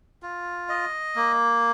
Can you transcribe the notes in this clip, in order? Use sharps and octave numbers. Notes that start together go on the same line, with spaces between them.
F4
D#5
A#3